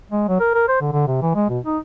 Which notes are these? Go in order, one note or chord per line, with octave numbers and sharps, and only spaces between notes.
G#3
F#3
A#4
A#4
C5
D3
D3
C3
E3
G#3
B2
D#4